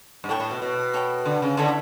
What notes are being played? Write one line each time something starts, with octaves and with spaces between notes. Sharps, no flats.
G2
A2 A4 C#5 G5 C#6
A2
B2
B2
A4 C#5 G5 B5
D3
C#3
D3 E4 A4 C#5 E5